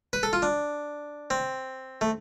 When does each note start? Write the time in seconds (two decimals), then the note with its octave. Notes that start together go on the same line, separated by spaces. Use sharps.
0.13 B4
0.23 A4
0.33 F4
0.42 D4
1.30 C4
2.01 A3